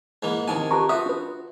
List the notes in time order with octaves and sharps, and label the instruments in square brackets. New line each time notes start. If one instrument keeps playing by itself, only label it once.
[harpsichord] G#2 E3 A#3
[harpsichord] C3 D#3 G#5 [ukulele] D#4 E4 A5
[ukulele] F4 G4 B4 [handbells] A5 A#5 C#6
[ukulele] F4 C5 E5 [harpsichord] F#4 [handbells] D#6
[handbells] D4 B4